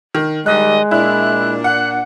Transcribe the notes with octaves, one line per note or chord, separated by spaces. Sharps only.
D#3
D#3 G3 G#3 D#5 F#6
A#2 D4 E4 F#6
F#5 F#6